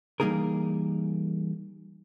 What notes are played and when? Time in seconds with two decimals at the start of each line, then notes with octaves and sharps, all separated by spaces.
0.20 E3 G3 A#3 D#4 G#4 A#4